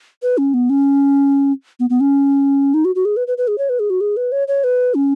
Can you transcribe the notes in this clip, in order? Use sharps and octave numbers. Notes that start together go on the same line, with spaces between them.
B4
C#4
B3
C#4
B3
B3
C#4
D#4
F#4
F#4
G#4
B4
B4
B4
G#4
C#5
B4
G#4
F#4
G#4
B4
C#5
C#5
B4
C#4